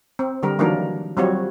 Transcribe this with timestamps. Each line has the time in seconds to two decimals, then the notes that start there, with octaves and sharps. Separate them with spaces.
0.19 C4
0.43 D3 G3 A#4
0.59 D#3 E3 F#3 A#3 D4 A#4
1.17 F#3 G3 C4 F4 F#4 C#5